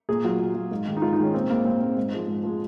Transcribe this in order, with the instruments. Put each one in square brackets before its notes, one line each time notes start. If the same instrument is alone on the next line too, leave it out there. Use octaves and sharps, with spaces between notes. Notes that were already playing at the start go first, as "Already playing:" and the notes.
[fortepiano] A#2 G#4
F#3 F4
A#2
F#3
G#2
D#3 G#3
D#4
G#2 F4
D#4
D#3 G#3 C#4
A#2 C4
G#3 A#3
A#2 C4
G#3 C4
G#2
F3 G#3
G#2
F3 G#3